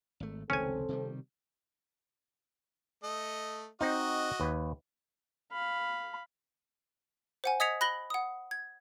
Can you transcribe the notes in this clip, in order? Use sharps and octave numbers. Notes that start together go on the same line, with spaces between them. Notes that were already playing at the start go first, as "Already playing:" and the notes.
G#1 A3
F1 C#2 D#3 C4 C#4 A4 G#5
C3 D#3 G3
A3 D#5
C4 D#4 F#4 D#5
D#2 B4
F5 B5
C5 F#5 G#5
D#5 D#6 G#6 B6 C#7 F7
B5 F#6 A#6 F#7 G7
F#5 D#6
G#6